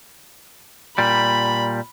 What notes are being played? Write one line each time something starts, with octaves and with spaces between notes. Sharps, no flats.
A#2 G3 B5